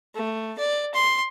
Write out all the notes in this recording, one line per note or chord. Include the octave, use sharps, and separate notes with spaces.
A3
D5
C6